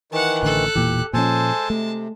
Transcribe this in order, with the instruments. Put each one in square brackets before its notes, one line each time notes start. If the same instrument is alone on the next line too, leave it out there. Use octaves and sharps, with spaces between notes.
[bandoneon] D#3 E3 [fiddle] F#5 A5
[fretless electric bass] A1 D3 [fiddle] A4 F#6
[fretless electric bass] E1 A#2 E3 [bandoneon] G4
[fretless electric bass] A#2 F3 C#4 [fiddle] G#3 A5 [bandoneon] A4 C5 G#5
[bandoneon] C3 [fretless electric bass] A3